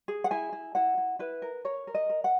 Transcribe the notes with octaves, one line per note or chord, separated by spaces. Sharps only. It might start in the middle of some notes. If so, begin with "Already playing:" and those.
G#4
F#5
E4 G#5
E4
E4 F#5
E4
E4 B4
A#4
A#4 C#5
A#4
D#5
A#4
F#5